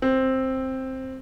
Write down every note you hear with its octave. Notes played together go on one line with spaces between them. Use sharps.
C4